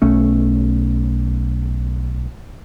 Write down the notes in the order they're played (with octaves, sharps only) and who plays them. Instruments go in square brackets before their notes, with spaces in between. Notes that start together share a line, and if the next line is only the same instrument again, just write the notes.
[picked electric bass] B1 A3 C#4